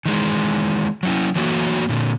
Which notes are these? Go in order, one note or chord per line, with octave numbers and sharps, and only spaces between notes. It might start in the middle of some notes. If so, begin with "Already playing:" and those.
D#3 E3 G#3
F#3 C#4 E4
E3 F#3 A3 A#3 F#4
A#2 D3